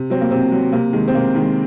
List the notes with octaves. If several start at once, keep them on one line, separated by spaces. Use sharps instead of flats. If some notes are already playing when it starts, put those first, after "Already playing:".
Already playing: C3
F#3 C4
A#3
C3 C4
F#3
C3 A#3
D#3 G#3
C4
C3 A#3
D#3 G#3